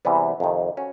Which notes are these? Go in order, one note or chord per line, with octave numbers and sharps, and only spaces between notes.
E2 C3 E3 G3 B3
F2 C3 D#3
C#4 F#4